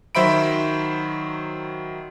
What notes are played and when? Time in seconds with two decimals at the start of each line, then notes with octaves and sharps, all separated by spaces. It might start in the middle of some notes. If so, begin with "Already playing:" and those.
0.15 D#3 F#3 C5 E5 B5 D7